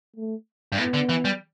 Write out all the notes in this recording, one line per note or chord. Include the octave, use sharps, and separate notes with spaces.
A3
G2
A2 B3
D3
E3
G3